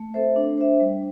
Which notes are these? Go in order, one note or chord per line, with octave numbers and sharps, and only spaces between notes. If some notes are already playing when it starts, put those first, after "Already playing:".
Already playing: A3
C4 A4 C5 E5
D4
C5 E5
G3